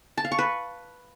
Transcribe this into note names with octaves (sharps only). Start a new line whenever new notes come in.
A5
F5
C#6
B4